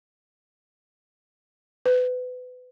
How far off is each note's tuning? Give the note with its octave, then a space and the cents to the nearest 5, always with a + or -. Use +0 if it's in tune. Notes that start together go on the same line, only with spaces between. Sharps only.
B4 +25